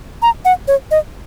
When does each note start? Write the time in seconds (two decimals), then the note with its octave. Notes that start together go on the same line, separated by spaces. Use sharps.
0.22 A#5
0.45 F#5
0.68 C#5
0.91 D#5